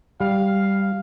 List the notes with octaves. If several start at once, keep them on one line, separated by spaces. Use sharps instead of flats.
G3 F5